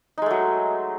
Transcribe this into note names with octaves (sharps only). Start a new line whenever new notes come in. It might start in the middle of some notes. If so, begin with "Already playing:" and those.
F#3 G#3 A3 D#4